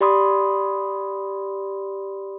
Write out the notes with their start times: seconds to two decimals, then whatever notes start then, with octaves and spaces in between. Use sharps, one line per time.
0.01 G4 D5 B5 C6 D#6